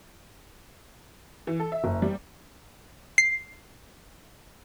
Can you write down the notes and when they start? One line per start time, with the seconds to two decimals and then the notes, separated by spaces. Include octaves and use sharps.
1.47 E3
1.60 A4
1.72 E5
1.84 F#1
2.02 G3
3.18 C7